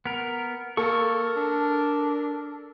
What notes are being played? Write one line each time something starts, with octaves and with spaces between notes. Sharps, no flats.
B3 A#4
A#3 A4 A#4 C#6
D4